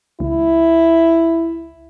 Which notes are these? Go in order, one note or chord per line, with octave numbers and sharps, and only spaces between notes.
C#2 E4